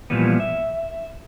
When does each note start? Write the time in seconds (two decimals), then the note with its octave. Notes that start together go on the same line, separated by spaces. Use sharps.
0.10 A#2 E3 F3 G3 B3
0.40 E5